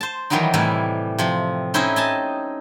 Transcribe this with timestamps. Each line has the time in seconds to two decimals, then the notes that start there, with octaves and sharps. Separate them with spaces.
0.01 C5 A5
0.30 D#3 E3 F#3 G3 D#4
0.54 A2 C3 E3 G3 E4
1.19 C3 F3
1.74 C4 C#4 D#4 E4 C5 D#5
1.96 D#5 G#5 A5